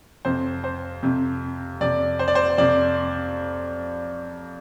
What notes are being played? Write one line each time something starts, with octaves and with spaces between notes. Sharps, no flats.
F2 C3 C5
C5
F2 C3
F2 C3 D5
C5
D5
C5
F2 C3 D5